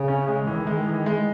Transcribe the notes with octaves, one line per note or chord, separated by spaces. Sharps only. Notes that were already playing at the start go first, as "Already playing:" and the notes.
Already playing: C#3
C#4
G#3
D#3 E3
G#3
E3
G#3